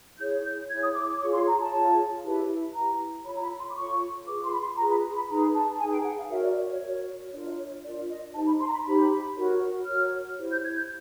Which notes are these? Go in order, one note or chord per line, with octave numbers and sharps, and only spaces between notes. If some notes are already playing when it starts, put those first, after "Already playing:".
E4 G#4 C#5 G6
G6
E4 G#4 C#5 G#6
D#6
D6
D6
F4 G#4 C#5 C#6
C6
A#5
A5
F4 G#4 C#5
E4 G4 B4
E4 G4 B4 A#5
F4 A4 C#5 B5
A#5
B5
C6
D6
F4 A4 C#5 C#6
F4 G#4 B4 D6
C6
B5
C6
F4 G#4 B4 A#5
B5
B5
D#4 G#4 B4 A#5
A5
D#4 G#4 B4 G#5
G5
F#5
F5
F#4 A#4 C#5 E5
D5
C#5
C#5
F#4 A#4 C#5
D4 F4 A#4 D5
D#5
C#5
D4 F4 A#4 D5
D#5
D#4 G4 C5 A5
B5
C6
A#5
B5
A#5
D#4 G4 C5 B5
F#4 A#4 C#5
F#4 A#4 C#5 F6
E4 G4 C5
G6
G#6
G6